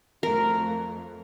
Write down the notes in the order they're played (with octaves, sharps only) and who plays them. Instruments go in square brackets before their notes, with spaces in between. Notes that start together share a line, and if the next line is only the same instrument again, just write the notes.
[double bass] F2 A3 [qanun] A#4